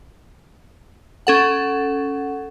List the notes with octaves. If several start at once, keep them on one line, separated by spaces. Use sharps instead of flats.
C#4 A4 F#5